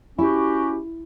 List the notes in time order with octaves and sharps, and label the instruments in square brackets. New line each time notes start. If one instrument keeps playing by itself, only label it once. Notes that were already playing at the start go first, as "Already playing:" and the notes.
[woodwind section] C#4 F#4 G4 [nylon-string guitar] E4